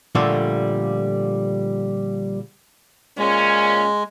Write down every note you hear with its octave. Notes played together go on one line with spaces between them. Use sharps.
A#2 D3 F3 G3 A3 A#3
A#2 G#3 C#4